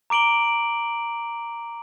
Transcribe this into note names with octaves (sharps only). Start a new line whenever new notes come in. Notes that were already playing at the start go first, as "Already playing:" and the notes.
A#5 D6 D7 F#7 G7